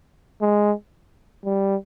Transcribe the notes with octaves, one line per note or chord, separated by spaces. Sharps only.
G#3
G3